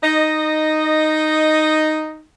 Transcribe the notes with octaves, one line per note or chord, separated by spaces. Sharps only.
D#4 D#5